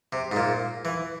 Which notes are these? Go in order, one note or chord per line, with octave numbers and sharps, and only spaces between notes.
C3
G#2
A#2
E3